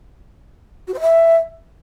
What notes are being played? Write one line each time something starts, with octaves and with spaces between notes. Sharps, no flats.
F#4
C5
E5